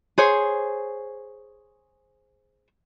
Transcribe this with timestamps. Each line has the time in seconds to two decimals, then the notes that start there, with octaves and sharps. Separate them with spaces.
0.18 G#4 C5 C#5